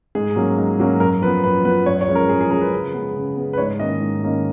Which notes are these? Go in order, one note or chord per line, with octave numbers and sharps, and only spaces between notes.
G#2 G#4
F#3 A#3 C#4
G#2
F#3 A#3 C#4
F#2 A#4
F3 B3 B4
F#2 B4
F3 B3 B4
F#2 C#5
C#5
F3 G#3 C#4
A#4
F#2 G#4
G#4
F3 G#3 C#4 A#4
B4
C#3
G#3 B3
C#3
G#3 B3
B4
G#2 C#5
D#3 A#3 C#4 D#5
G#2
D#3 A#3 C#4